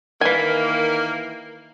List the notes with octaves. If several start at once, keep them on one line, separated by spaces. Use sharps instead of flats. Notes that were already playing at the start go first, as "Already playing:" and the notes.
D#3 E3 A#3 G#5